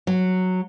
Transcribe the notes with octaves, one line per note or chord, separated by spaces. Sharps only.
F#3